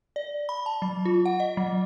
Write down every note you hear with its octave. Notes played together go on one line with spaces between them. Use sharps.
D5
B5
A5
F#3
F4
F#5
D#5
F#3